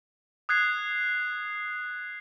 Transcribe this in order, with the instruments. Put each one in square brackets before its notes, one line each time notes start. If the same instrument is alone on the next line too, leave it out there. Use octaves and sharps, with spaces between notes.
[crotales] D#6 F#6 G#6 C7